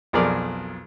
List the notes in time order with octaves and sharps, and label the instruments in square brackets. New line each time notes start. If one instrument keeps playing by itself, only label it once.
[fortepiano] B1 F2 G#4 A#4 D5